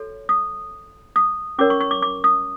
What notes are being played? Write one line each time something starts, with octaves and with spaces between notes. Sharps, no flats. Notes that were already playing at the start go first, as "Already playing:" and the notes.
Already playing: F#4 A4 C#5
D#6
D#6
C#4 F#4 A#4 C#5 D6
C#6
C#6
D6
D6
D#6